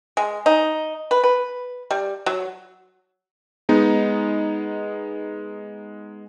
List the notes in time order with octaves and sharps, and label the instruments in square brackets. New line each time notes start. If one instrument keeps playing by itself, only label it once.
[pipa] G#3
D#4
B4
B4
G3
F#3
[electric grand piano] G#3 B3 D#4